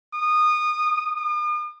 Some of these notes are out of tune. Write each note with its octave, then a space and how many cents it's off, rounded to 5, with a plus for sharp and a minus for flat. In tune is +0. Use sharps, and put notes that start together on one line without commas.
D#6 -20
D#6 -45